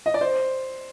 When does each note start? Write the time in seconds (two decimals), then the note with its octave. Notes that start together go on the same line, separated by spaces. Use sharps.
0.06 D#5
0.14 D5
0.21 C5